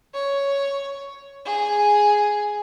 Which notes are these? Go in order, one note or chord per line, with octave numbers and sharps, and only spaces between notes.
C#5
G#4